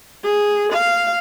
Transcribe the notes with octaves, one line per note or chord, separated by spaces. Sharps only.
G#4
F5